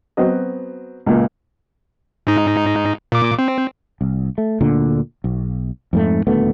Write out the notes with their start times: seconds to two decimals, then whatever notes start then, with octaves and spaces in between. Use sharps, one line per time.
0.17 F#3 B3 C4 D#5
1.06 C#2 A#2
2.27 G#2 D#4
3.12 A#2 D6
3.39 C4
4.01 C2
4.38 A3
4.61 D2 A#2 D3
5.24 B1
5.93 F2 G#2 A3
6.27 D#1 D2 A3 B3